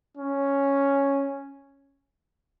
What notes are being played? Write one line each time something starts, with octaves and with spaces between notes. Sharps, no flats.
C#4